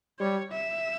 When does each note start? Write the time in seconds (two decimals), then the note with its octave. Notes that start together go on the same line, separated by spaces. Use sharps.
0.20 G3 C#5
0.52 E5